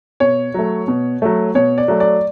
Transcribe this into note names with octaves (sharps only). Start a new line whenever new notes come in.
B2 C#5
F#3 A3
B2
F#3 A3
B2 C#5
D5
F#3 A3
D5